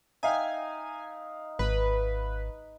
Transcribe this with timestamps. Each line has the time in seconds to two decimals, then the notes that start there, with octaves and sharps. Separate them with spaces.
0.23 D#4 E5 F5 G5 G#5
1.59 G#1 B4